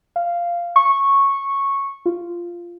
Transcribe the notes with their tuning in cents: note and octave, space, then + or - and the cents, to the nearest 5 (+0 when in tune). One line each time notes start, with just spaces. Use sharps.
F5 -10
C#6 -10
F4 -10